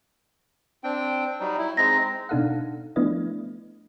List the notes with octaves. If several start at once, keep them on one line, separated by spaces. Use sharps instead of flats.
C4 D4 G5
F#3 G3 D#4
E4
G#3 C4 D#4 A#6
B2 D4 D#4 A4 F5 F#5
F3 A3 B3 D4 E4 D#5